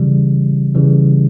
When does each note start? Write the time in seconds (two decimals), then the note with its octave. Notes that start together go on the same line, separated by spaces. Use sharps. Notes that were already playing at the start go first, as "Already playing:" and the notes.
Already playing: C#3 E3 G3
0.75 C#3 E3 G3